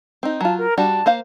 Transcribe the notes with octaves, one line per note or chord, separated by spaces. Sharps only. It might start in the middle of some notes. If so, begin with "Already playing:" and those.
C4 D#4
F#3 F4 A5
A#4
G3 D4 F#4 A5
A#3 C5 F5